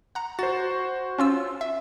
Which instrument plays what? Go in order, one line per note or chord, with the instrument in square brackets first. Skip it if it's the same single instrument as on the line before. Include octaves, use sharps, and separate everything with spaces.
[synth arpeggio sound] F#5 A#5
[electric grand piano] F#4 C5 [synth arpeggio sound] A6
[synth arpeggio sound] C#4 F4 E6
E5